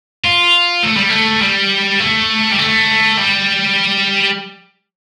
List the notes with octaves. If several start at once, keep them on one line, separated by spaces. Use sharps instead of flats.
F4
A3
G3
A3
G3
A3
G3
A3
G3